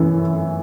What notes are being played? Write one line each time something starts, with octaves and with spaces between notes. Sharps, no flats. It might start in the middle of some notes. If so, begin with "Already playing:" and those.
Already playing: F#2 E3